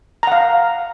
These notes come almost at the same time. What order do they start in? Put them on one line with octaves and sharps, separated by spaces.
A#5 F#5 F5